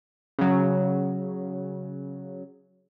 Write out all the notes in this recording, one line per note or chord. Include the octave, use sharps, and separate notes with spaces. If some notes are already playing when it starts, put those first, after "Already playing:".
C#3 F#3